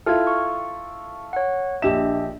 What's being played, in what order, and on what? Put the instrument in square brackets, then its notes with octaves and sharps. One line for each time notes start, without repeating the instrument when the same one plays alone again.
[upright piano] E4 F4 A4 [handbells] F6 G#6
[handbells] C#6
C#5 F#5
[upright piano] A#1 G4 E7 [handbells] D4 D#5 E5